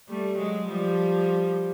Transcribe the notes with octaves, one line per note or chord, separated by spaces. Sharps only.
G3 A3
F#3 G#3
F3 G3